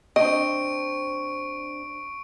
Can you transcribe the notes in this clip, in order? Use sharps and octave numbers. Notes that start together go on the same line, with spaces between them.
C4 D4 D#5 C#6 D7